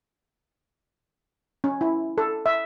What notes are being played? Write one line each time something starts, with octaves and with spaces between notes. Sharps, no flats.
C#4
E4
A4
E5